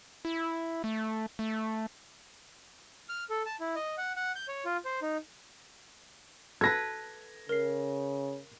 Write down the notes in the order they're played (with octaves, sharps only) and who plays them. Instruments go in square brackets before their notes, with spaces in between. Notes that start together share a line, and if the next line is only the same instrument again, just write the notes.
[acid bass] E4
A3
A3
[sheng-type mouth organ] F6
A4
A5
E4
D#5
F#5
F#5
G6
C#5
F4
C5
D#4
[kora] A4 B4 [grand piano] G#6 A#6
[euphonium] C#3 [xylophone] A#4 C7